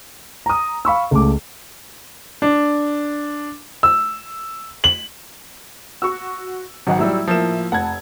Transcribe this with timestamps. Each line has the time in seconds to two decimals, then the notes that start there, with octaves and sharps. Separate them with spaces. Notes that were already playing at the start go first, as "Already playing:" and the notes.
0.46 A#5 D#6
0.85 F5 B5 C#6 E6
1.11 C#2 A3 D6
2.42 D4
3.83 E6
4.84 F#7
6.02 F#4 C#6 E6
6.87 G#1 F#3 D#5 F#5
6.99 A2 F#3 G3 E4 E6
7.27 F3 A#3 E7
7.72 F1 F#5 A5 G#6